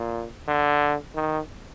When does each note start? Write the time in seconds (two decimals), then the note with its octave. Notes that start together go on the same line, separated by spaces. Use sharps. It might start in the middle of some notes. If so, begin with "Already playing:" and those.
Already playing: A#2
0.48 D3
1.15 D#3